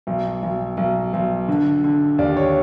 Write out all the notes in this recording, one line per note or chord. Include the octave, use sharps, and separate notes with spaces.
B1
B1
B1
B1
D3
D3
D#2 D5
C#5